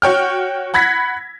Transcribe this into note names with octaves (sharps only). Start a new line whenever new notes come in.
F#4 C#5 G5 F6
F#5 B5 G#6 A#6 B6